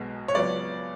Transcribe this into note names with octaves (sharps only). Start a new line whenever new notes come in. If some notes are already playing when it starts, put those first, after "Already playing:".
Already playing: B1 B2 G#3 B3
C#5
C#2 C#3 F#3 B3 D5